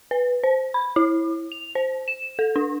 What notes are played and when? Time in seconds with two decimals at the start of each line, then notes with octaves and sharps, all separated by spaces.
0.11 B4
0.43 C5
0.74 B5
0.96 E4
1.52 F7
1.75 C5
2.08 E7
2.39 A4
2.56 D4